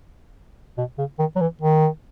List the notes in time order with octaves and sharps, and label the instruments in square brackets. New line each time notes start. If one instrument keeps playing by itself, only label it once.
[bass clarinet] B2
C#3
D#3
F#3
E3
D#3